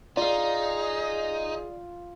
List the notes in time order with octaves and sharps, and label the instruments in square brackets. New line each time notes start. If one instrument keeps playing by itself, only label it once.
[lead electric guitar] D#4 [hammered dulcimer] F4 F5 [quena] G#4 [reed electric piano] D5